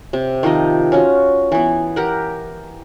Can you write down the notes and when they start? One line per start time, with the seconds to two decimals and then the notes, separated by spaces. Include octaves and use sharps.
0.13 C3
0.43 D#3 F3 D#4 D#5
0.92 C#4 F4 F#4
1.52 E3 B3
1.96 G4 A#4 F#5